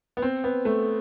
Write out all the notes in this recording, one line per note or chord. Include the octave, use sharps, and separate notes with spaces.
B3
C4
B3
A3